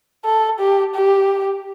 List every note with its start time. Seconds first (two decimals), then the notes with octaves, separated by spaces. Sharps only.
0.25 A4
0.59 G4
0.95 G4